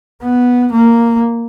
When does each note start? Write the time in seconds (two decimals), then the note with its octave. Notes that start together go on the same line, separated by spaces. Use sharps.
0.23 B3
0.73 A#3